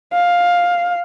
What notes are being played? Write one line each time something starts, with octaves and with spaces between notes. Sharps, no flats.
F5